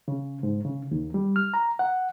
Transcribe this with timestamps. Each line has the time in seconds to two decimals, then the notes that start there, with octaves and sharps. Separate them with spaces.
0.08 C#3
0.43 G#2
0.65 C#3
0.91 D#2
1.14 G3
1.36 F6
1.54 A#5
1.79 F#5